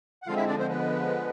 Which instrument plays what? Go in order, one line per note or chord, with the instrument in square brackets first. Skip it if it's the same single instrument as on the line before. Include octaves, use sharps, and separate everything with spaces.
[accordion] F#5
D3 F3 G#3 C4 F4 F5
E4 E5
D4 D5
C4 C5
B3 B4